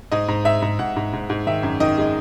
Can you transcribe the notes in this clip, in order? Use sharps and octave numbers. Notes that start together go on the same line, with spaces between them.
G#2 D#5
G#2
G#2 E5
G#2
G#2 F#5
G#2
G#2
G#2
D#3 E5
F#2
D#3 D#5
G#3